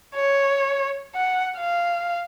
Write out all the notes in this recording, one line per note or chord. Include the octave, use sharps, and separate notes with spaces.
C#5
F#5
F5